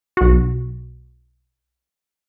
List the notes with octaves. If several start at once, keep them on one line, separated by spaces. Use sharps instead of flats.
B1 F#4